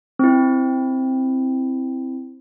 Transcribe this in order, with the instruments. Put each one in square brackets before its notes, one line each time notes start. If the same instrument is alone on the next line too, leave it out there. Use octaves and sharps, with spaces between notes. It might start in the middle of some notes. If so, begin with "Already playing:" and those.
[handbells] C4 E4